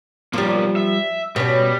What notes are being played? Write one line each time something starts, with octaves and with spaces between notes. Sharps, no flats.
B1 F3 G3 A#3
E5
B2 G3 C#4